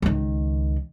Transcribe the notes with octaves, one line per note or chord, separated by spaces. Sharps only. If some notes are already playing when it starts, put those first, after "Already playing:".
C#2 D#3